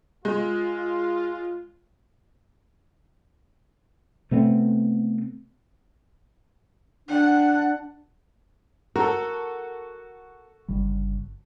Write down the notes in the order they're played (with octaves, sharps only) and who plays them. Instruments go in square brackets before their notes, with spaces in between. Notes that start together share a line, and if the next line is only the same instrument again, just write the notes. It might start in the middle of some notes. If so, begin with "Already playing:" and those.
[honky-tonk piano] G#3 [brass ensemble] F4
[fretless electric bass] C3 A3 B3 C4
[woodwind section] D4 [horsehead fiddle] F#5
[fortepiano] F#4 A4 [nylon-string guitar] A#4
[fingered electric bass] G1 C#3 G3